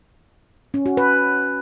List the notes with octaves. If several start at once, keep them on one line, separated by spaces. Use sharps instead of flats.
C#4
F#4
B4